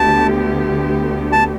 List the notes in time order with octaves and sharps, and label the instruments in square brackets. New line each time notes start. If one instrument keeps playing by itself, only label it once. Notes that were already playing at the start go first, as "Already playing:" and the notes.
Already playing: [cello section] D2 D3 B3 G4 [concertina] A5
[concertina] A5